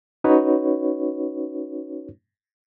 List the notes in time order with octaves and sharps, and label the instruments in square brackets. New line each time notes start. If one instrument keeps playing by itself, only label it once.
[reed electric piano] C#4 D#4 F#4 B4 C#5